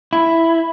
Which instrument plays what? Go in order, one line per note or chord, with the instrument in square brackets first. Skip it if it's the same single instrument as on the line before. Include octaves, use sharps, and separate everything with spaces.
[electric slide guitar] E4